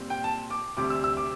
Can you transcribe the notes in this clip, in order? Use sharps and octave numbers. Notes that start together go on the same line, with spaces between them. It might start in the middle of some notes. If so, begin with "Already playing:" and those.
Already playing: A#2 G3 C4
G5
A5
D6
D2 C3 G3 C4 D6
E6
E6
D6